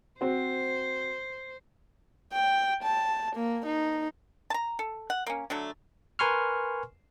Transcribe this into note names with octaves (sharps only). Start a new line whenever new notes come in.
C4 F#4 C5
G5
A5
A#3
D#4
A5 A#5
A4
F#5
A#3 C#4
D3 F#3 A3
A#4 B4 G#5 C6 C#6 F6